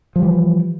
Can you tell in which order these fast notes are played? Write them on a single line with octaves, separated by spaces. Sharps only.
F3 G3 E3